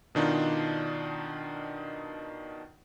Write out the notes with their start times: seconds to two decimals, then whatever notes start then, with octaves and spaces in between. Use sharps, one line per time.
0.15 B2 D#3 D4 D#4 F4